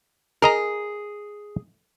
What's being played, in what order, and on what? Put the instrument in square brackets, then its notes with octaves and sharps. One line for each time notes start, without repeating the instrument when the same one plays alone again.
[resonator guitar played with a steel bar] G#4 [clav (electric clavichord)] A#4 D#5 A#5